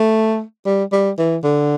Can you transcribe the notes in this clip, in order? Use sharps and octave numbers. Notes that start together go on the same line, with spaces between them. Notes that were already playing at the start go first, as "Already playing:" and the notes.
Already playing: A3
G3
G3
E3
D3